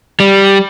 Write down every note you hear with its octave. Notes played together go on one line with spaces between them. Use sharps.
G3